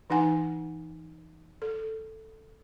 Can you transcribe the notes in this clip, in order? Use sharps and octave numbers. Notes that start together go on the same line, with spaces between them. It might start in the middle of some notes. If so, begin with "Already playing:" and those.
E3 D#4 F#5 G#5
A4